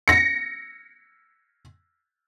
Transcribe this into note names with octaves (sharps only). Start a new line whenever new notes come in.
A#6 C#7